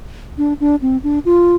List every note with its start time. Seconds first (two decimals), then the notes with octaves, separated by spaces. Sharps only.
0.38 D4
0.60 D4
0.82 C4
1.04 D4
1.25 F4